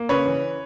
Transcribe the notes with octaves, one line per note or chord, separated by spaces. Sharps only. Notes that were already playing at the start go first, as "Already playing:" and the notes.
Already playing: A#3
C#3 B4 C#5
E3